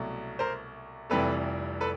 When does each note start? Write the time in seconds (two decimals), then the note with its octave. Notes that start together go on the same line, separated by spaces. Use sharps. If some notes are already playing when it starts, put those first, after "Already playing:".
Already playing: C2 B2 F#3 A3
0.39 A#4 C5
1.10 F1 F2 C3 E3 G3 A4 B4
1.81 A4 B4